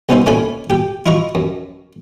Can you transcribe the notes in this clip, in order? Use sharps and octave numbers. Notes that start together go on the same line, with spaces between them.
C2 B3 C#4 D#4 C5 E5
A#2 A3 C#4 D4 G#5 B5
G4 G5
E4 F4 D#5 A#5 C#6
F#2